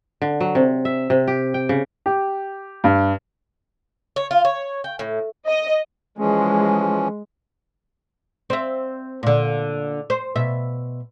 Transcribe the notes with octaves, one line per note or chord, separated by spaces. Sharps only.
D3
F#3
C3
E5
C3
G4
G5
C#3
G4
G2
C#5
F4
C#5
G5
A2
D#5
E3 F3 G#3 C#4
C4 E5
A#2 D3
C5
B2 E5